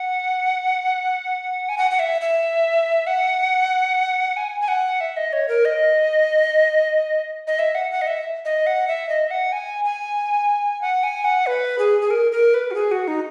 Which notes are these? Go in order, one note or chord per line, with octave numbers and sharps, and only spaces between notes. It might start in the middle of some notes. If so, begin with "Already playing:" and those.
Already playing: F#5
G#5
F#5
F#5
E5
E5
F#5
G#5
G#5
F#5
E5
D#5
C#5
A#4
D#5
D#5
E5
F#5
F#5
D#5
E5
D#5
F#5
E5
D#5
E5
F#5
G#5
G#5
F#5
G#5
F#5
B4
G#4
G#4
A#4
A#4
B4
F#4
G#4
F#4
D#4